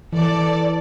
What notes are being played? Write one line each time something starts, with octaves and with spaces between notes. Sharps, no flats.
E3 A4 D5